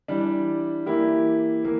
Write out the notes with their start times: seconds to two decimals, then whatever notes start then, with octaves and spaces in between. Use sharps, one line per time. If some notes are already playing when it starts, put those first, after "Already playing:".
0.08 E3 G3 D4
0.86 E3 A#3 E4 G4
1.65 E3 A#3